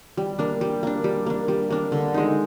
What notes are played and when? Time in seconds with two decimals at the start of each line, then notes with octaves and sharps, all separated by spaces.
0.17 G3
0.39 A#3 D4
0.61 G3
0.83 A#3 D4
1.04 G3
1.26 A#3 D4
1.48 G3
1.70 A#3 D4
1.92 D3
2.14 G#3 D#4